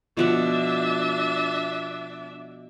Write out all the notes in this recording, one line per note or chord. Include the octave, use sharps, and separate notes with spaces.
B2 F3 D4 E5 F#5